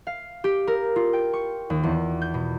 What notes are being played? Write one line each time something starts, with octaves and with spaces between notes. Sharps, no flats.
F5
G4
A#4
F4
G5
C#6
D#2
E2
G6
B2